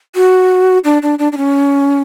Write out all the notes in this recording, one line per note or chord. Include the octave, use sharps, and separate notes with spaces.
F#4
D4
D4
D4
D4
C#4